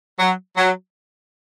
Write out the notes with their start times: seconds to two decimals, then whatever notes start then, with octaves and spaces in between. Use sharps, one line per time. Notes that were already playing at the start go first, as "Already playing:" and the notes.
0.20 F#3
0.57 F#3